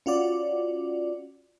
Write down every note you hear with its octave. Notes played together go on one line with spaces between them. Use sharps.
C#4 F4 F#4 D5